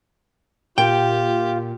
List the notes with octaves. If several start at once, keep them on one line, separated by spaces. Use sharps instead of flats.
A#2 F4 G4 G5